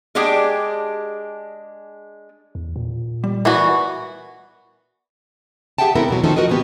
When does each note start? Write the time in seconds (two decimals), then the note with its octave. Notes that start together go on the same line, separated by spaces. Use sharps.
0.15 G#3 D4 G4 G#4 G5
2.55 E2
2.76 A#2
3.24 G3
3.45 E3 B3 F#4 A#4 D5 G#5
5.78 G4 G#4 E5 F#5 G5 A5
5.95 C#3 B3 C4 E4 A4 A#4
6.08 E2 B2 F#3
6.24 D#3 F3 A3 C#4 D#4 A4
6.36 F#4 A#4 B4 D#5
6.49 A#2 D3 B3 G4